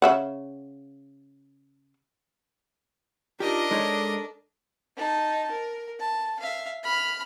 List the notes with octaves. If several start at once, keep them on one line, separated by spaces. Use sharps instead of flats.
C#3 E5 F#5
D4 D#4 F4 G4 A#4 D#5
G#3 D#4 A4 C#5
D#4 A5
A#4
A5
E5 F5
B5 F6